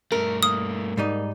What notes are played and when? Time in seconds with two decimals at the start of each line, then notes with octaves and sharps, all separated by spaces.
0.12 G2 A3 A#4
0.43 A#3 D#6
0.97 G#2 G3 D#4